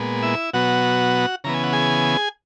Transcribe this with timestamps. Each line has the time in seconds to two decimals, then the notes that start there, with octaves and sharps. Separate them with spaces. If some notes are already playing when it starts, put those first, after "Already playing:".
Already playing: A#2 G#3 B3
0.23 E4 E5
0.53 B2 F#3 B3 F#4 F#5
1.44 C#3 E3 B3 A#5
1.54 G#5
1.64 F#5
1.73 G#4 G#5